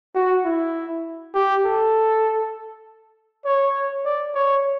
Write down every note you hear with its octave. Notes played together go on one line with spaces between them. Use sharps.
F#4
E4
G4
A4
C#5
D5
C#5